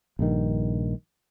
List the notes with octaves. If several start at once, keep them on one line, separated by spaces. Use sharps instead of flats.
A#1 G2 D#3